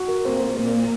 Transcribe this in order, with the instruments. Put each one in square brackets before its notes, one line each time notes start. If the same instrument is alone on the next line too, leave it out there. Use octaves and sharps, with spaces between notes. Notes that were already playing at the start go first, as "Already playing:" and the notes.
Already playing: [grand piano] F#4
A#4
[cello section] A#2 A#3 [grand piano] C4
[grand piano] C4
[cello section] A#2 A#3 [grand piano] C4